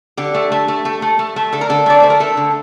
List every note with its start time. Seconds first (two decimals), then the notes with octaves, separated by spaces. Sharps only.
0.17 D3 G4
0.35 A3
0.52 A3
0.68 A3
0.85 A3
1.02 A3
1.19 A3
1.36 A3
1.53 D3 A4
1.61 A#4
1.70 D3 A4
1.86 A3 D5
2.00 A3 C5
2.10 A#4
2.20 A3 A4
2.37 D3